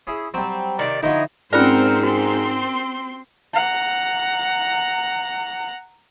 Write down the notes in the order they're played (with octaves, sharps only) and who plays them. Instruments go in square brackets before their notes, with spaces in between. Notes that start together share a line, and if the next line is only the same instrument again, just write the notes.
[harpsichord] C#4 E4 G#4
[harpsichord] F#3 G3 [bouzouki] C4
[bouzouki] C3 D#3 [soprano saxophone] D5
[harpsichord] D3 F3 F#3 [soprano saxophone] D#4 [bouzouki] E4 D#5
[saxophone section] G#2 [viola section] C4 C5 [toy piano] C#4 F4 D5 [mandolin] A#4 F#5
[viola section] C4 C6 [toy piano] F#4
[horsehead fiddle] F#5 A#5